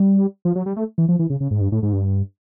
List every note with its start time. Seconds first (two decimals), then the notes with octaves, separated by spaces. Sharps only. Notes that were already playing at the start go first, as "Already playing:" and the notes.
Already playing: G3
0.45 F3
0.55 F#3
0.66 G3
0.76 A3
0.98 E3
1.09 F3
1.19 E3
1.30 C#3
1.40 C#3
1.51 G#2
1.61 G2
1.72 A2
1.83 G#2
1.93 G2